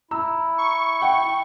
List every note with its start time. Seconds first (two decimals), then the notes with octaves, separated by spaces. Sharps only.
0.11 E4 A#5 E6
0.58 C#6
1.01 F#5 G5